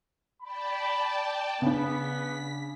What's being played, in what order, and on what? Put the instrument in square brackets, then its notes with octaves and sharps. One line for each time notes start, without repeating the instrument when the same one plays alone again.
[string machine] D5 G5 A5 [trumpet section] B5
[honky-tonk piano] C#3 D4 [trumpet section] B3 [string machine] B6